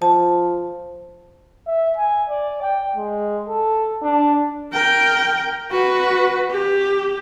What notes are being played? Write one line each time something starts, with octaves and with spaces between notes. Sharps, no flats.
F3 A5
E5
G#5
D5
G5
G#3
A4
D4
A#4 G5
F#4 B4
G4